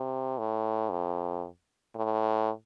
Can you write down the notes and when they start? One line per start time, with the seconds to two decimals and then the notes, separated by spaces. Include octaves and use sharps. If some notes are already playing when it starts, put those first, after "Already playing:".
Already playing: C3
0.38 A2
0.91 F2
1.95 A2